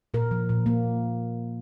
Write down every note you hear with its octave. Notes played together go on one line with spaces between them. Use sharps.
A#2 A#4
F3
A#2
A#3